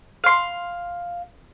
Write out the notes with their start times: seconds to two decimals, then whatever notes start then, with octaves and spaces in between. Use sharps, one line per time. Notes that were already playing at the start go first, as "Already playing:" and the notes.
0.24 F5 C6